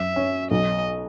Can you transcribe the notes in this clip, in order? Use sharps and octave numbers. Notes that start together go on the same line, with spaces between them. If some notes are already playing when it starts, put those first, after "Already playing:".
Already playing: F#2 E5
C#4
B1 D#5